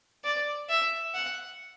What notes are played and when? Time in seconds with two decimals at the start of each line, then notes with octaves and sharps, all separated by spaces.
0.24 D5
0.69 E5
1.14 F#5